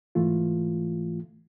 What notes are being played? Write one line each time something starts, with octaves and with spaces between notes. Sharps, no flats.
G#2 E3 A3 F4